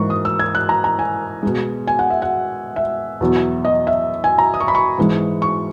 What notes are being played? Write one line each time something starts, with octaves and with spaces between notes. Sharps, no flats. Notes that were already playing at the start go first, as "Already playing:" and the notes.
Already playing: G#2 E3 A#3 C#6
D#6
E6
G#6
F#6
A#5
A#5
G#5
B2 G#3
G#5
F#5
E5
F#5
E5
E2 B2 F#3
D#5
E5
G#5
A#5
D#6
C#6
B5
C#6
G#2 E3 G#3
C#6